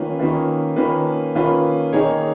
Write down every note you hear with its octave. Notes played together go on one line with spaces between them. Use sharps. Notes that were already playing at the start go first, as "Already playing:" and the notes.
Already playing: D#3 A#3 C#4 F4 B4
D#3 A#3 C#4 F4 B4
D#3 A#3 C#4 F4 B4
D#3 A#3 C#4 F4 B4
D#3 A#3 D#4 G#4 C#5